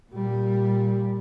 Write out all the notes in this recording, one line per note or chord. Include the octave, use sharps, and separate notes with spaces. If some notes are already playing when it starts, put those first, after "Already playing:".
A#2 G3